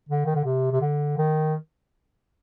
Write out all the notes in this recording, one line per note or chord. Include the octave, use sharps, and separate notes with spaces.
D3
D#3
D3
C3
C3
D3
D#3